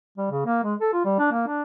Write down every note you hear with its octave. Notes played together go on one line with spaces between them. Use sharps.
G3
C#3
A#3
G#3
A4
F4
G3
D4
A#3
D4